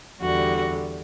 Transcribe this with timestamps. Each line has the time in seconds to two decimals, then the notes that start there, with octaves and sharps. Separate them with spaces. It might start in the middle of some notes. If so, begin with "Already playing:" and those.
0.21 E2 D3 G3 F#4